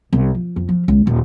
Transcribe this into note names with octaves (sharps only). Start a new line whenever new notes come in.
C2
F3
F2
F3
C#2
D#1